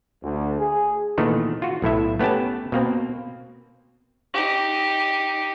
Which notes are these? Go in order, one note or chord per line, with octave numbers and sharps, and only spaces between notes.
D2
G#4
A#2 D#3 E3 A3 B3 D#4
F4 F#4
B1 A2 E4 E5
A3 B3 C#4 G4 A5
B2 A#3 C4
D#4 G4